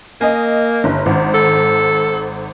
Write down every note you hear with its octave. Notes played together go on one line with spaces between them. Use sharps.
A#3 D#5 G#5
G1
G#1
A4